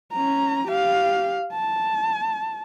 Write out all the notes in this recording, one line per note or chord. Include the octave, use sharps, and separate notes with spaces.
C#4 A#5
G4 F5
A5